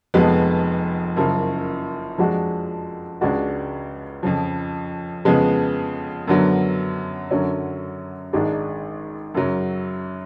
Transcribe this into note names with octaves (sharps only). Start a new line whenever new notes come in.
F1 F2 F3 G#3 B3
F#1 F#2 C#3 F3
F2 F3 G#3 D4 F#4
C#2 C#3 G#3 D4 F#4
F2 C#3 F3
F2 C#3 F3 G#3 B3
F#2 D3 F#3 B3
F#2 D3 F#3 C#4
G#1 G#2 G#3 D4
F#2 C#3 F#3